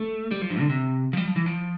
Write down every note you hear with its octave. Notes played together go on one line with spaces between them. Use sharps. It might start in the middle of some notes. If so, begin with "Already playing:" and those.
Already playing: A3
G3
F3
G2
D3
C3
F3
G3
F3
E3
F3